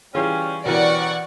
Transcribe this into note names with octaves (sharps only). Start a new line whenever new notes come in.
E3 G3 C#4 F4 G#4
B2 E3 G3 C#4 A#4 D5 F#5 C#6